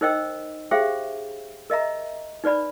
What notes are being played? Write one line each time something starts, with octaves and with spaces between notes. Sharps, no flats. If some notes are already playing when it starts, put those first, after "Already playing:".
D#4 A#4 C5 D#5 G5 E6
G4 G#4 C5 E5 F5 G5
A#4 D#5 E5 A#5
D#4 B4 D5 B5